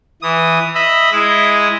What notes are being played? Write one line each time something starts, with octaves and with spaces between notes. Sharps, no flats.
E3 D#6
D#5 E5 B5
G#3 E4 D#5